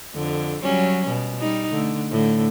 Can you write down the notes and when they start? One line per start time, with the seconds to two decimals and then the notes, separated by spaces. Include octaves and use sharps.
0.15 F2 D3
0.63 F#3 G3 C#4
1.08 B2
1.40 G3 D#4
1.71 D3 A3
2.11 A2 D3